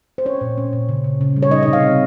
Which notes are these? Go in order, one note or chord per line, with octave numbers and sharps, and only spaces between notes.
C5
C#4 C#5
A#2
C#4
A#2
C#3
C#3
C#3
G3
C#5
D#4 D#5
D#5
C3
F5
C4